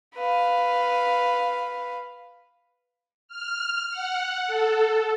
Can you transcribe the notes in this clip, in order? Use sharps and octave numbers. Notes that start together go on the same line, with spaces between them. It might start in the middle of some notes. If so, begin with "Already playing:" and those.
B4 F5
F6
F#5
A4